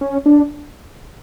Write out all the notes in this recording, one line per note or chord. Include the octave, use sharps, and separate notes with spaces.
C#4
D4